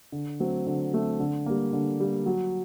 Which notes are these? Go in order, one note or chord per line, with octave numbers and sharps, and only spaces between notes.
D3
F#3 A3 C4
D3
F#3 A3 C4
D3
G3 A#3
D3
G3 A#3
F#3